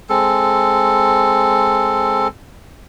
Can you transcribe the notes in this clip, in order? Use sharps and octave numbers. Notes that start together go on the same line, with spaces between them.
G#3 C4 A4